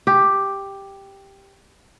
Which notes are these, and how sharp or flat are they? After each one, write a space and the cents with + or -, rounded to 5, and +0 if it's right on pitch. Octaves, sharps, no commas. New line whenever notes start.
G4 +5